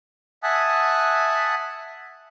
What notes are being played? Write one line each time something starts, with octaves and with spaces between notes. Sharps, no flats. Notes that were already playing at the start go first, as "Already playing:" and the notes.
E5 F#5 G#5 A5 D#6 F#6